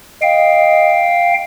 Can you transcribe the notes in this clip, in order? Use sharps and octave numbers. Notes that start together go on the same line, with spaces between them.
D#5 F5 G5